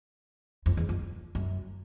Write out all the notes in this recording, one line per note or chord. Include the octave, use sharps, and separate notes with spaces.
F2
E2
F2
F#2